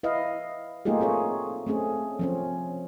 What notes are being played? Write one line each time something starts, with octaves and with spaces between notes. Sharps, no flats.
E4 B4 D#5 F5
A3 A#3 D#4 F4 G4 G#4
C4 F4 G#4 C#5
A3 C4 C#4 G#4
F3 C4 C#4